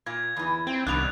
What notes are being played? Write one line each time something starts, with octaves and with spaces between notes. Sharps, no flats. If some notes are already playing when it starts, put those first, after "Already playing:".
A#2 G#6
E2 E3
C4 G5
C2 D#3 B3 D4 F#6 F7